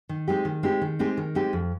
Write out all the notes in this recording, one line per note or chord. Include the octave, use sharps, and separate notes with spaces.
D#3
G#3 C4 D#4 G4
D#3
G#3 C4 D#4 G4
D#3
G#3 C4 D#4 G4
D#3
G#3 C4 D#4 G4
F2